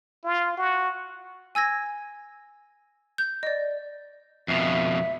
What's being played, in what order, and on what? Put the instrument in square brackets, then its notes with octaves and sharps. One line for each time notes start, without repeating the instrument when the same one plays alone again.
[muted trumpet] F4
F#4
[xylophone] G#5 E6 G#6 A#6
G6
D5 D#5
[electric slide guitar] F2 B2 [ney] E5